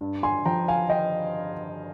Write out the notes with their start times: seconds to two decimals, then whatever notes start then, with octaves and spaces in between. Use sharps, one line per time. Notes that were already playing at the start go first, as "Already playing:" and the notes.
0.01 G2
0.23 G#5 C6
0.45 F3 G5 A#5
0.68 F5 G#5
0.90 D#5 G5